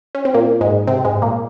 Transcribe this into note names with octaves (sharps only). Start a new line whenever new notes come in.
C#4
C4
A#2 A#3
G#2 G#3
C3 C4
G#2 G#3
A#2 A#3